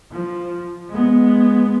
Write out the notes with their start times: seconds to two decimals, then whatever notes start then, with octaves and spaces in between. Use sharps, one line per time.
0.12 F3
0.89 G#3 B3